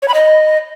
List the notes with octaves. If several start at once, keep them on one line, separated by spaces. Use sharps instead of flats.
C#5
B5
D#5